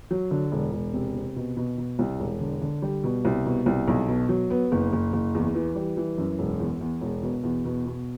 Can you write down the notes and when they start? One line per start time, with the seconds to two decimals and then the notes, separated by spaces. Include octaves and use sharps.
0.11 F#3
0.31 D3
0.52 E1
0.73 E1
0.94 C3
1.15 C3
1.36 B2
1.57 B2
1.78 B2
1.99 C2
2.20 E1
2.40 D3
2.62 D3
2.82 G3
3.04 B2
3.25 C2
3.46 B2
3.66 C2
3.88 B1
4.08 B2
4.29 F#3
4.50 B3
4.72 F#1
4.93 F#1
5.13 F#1
5.35 E2
5.55 E3
5.75 G3
5.97 E3
6.18 F#2
6.39 E1
6.60 E2
6.81 E2
7.01 E1
7.23 B2
7.43 E2
7.65 B2
7.86 B2